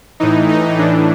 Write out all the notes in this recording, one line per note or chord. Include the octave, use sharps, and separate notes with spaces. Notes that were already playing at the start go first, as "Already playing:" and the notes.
A2 E3 D#4
D#4
A2 E3 D4